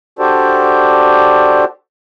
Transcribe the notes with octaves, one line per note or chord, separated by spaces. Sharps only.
D4 F#4 G4 A4 C5 D5